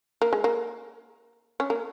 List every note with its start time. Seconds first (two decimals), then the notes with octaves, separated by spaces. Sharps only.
0.22 A#3
0.33 G#3
0.44 A#3
1.60 C#4
1.70 A#3